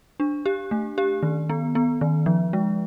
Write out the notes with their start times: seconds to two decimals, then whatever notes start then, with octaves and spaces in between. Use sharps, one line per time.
0.20 D4
0.46 G4
0.71 A3
0.98 G4
1.23 D#3
1.50 B3
1.75 B3
2.01 D#3
2.26 F3
2.53 G#3